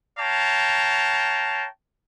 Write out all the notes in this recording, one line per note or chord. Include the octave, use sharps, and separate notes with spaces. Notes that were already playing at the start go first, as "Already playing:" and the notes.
C#5 F5 G5 A5 A#5